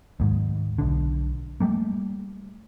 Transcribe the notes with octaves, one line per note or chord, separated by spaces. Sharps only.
D#2 G#2
B1 D3
G3 A3 A#3